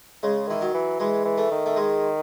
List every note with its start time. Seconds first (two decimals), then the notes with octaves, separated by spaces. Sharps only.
0.23 C#3 G#3
0.48 D#3 E3
0.61 F#3
0.74 E3
1.00 E3 G#3
1.24 E3
1.38 A3
1.51 D#3
1.66 A3
1.76 G#3